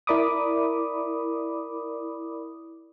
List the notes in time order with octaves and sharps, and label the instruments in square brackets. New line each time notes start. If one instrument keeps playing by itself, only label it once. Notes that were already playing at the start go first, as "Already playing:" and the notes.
[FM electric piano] E4 A#4 D5 B5 D6 D#6